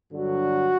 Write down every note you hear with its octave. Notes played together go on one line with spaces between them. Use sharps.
G2 D3 F#3 F#4